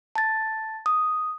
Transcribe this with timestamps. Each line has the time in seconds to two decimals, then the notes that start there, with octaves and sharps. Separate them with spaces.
0.16 A5 A6
0.86 D#6